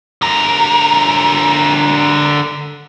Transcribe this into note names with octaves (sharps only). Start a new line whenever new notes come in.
D3 A#4